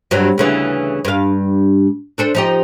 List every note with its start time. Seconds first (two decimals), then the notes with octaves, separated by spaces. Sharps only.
0.11 G2 C3 F#3
0.38 D2 C#3 E3
1.05 G2 F5
2.18 D4 A4 C5
2.35 F3 D#4 G4